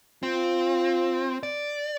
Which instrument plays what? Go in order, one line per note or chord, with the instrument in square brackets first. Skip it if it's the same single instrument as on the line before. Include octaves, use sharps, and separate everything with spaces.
[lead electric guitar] C4 [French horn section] F4
[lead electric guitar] D5